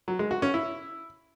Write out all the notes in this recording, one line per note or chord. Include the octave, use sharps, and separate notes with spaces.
F#3
G#3
F#4
C#4
E4